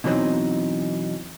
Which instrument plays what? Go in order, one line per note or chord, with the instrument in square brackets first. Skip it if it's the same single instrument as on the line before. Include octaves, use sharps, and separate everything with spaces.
[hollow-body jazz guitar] B2 E3 F#3 C4 D#4